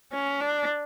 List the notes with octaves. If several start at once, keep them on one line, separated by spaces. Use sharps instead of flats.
C#4
D4